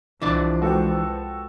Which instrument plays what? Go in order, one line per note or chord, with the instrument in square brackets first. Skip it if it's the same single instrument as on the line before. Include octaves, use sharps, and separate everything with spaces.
[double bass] C2 F3 [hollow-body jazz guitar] E3 D4 D5
[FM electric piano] G#3 B4 G5 [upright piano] F#4 A4